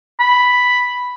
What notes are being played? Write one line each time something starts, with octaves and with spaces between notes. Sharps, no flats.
B5